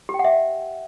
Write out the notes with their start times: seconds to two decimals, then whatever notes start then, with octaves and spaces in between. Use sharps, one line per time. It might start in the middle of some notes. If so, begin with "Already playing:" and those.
0.09 G4
0.14 G5
0.19 F#5
0.25 E5